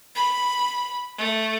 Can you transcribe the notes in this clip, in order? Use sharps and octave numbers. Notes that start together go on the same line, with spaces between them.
B5
A3